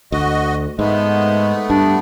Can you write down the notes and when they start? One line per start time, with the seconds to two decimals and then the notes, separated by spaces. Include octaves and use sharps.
0.12 D2 F#4 D#5
0.79 G#2 G#3 A3 B3
1.70 G2 D4